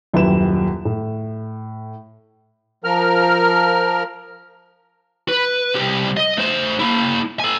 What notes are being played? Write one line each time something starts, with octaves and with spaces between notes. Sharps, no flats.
D#1 F#2 E4 G4 B4 E7
A2
F3 A#4 F6
B4
C2 G4
D#5
A3 C5
A#3 E4
A4 G#5